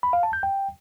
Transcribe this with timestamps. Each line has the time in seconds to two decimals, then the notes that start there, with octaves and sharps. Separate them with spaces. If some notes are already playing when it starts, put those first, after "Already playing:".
0.03 B5
0.13 F5
0.23 A5
0.33 G6
0.43 G5